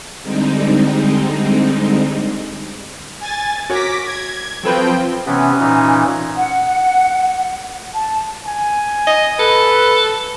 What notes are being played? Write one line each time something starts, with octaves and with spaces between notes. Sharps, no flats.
D3 G3 G#3 C4 D#4
G#5 A6
F#4 A#4 C#5 D6 A#6 B6
G#6
F3 F#3 C4 A4 B4 G5
C3 E3 B3 C#4
A#2 E3 D#4
F#5
A5
G#5
D#5
A4 B4